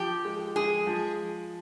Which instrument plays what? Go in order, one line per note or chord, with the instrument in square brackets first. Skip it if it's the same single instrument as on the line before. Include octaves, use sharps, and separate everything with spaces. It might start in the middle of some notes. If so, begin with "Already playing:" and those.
Already playing: [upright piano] F3 [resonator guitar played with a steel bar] G4
[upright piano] G#3
[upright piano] G#3 [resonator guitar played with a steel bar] G#4
[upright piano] F3